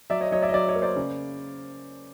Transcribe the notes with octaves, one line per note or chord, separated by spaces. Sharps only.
F#3 D5 E5
C#5 D#5
F#3 C#5 D#5
D5 E5
D#5
F#3 D5 E5
C#5 D#5
A#3
C5 D5
C#3